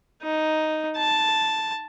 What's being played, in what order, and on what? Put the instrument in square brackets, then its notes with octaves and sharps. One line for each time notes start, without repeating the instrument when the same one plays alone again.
[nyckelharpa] D#4
A5